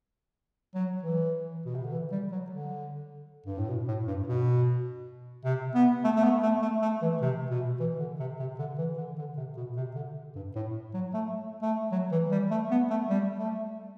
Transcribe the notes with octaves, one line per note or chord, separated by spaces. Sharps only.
F#3
E3
B2
C3
D3
E3
G3
F#3
D3
G2
A2
B2
A2
G2
B2
C3
B3
A3
A3
B3
A3
A3
A3
E3
C3
B2
E3
D3
C3
C3
D3
E3
D3
D3
C3
B2
C3
D3
G2
A2
F#3
A3
A3
F#3
E3
G3
A3
B3
A3
G3
A3